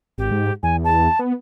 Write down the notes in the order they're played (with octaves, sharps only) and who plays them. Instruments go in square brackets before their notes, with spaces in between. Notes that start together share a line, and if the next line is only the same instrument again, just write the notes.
[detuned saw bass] G#1 [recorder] G4
[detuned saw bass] G#2
[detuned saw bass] E2 [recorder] G#5
[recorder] A5
[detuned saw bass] B3